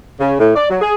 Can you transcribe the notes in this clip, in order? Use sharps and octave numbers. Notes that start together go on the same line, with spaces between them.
C#3
A2
D5
F#3
G#4